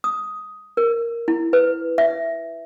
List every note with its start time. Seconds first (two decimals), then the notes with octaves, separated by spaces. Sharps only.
0.04 D#6
0.77 A#4
1.28 E4
1.53 B4
1.98 E5